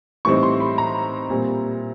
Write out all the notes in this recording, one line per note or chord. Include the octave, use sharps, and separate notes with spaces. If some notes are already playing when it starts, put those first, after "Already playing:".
A2 E3 G3 C4 D#4 C#6
C6
B5
A#5
A#2 G3 C4